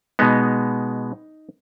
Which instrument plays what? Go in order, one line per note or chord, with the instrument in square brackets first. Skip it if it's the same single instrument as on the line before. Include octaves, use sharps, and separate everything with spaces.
[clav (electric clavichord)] B2 G#3 B3 D#4